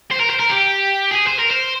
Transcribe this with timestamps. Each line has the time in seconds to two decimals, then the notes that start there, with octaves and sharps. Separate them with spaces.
0.11 C5
0.20 A#4
0.30 C5
0.40 A#4
0.50 G4
1.11 G#4
1.27 C5
1.39 A#4
1.51 C5